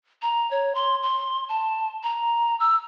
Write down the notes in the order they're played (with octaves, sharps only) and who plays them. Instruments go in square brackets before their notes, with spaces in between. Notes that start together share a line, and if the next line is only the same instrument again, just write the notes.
[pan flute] A#5
C#5
C6
C6
A5
A#5
E6